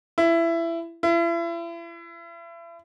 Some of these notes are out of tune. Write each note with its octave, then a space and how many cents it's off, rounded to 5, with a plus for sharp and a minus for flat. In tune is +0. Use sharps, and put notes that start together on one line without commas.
E4 +20
E4 +40